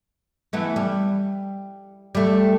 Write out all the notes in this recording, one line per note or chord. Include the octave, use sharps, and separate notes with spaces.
E3 A3 B3
G3
G3 A3